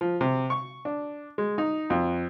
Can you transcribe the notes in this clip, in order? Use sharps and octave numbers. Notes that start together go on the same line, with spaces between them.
F3
C3
C#6
D4
G#3
D#4
F2